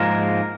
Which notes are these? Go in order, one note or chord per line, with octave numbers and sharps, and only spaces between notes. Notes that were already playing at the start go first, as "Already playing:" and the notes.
Already playing: G#2 F3 G#3 A#3 A#4